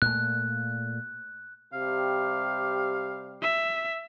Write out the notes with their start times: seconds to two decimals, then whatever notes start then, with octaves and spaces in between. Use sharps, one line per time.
0.02 A#2 A3 F#6
1.73 C3 G3 G4 F5
3.42 E5